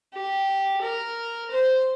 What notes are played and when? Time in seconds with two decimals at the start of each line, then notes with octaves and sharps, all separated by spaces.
0.14 G4
0.82 A#4
1.51 C5